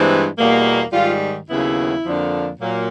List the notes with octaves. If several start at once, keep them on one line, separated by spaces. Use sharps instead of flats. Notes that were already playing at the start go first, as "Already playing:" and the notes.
Already playing: G2 E3 G#3 C4
E2 B2 G3 A#3
G#2 D#3 G3 F4
D#2 C#3 F#3 B3 E4
F2 D3 F3 A#3 D4
A#2 F#3 A#3